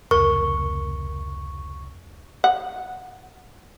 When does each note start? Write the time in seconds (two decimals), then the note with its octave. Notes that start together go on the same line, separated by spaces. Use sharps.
0.11 F1 C#2 A#4 C#6
2.44 F#5